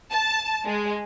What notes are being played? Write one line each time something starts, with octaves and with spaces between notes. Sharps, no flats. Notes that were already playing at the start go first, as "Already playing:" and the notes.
A5
G#3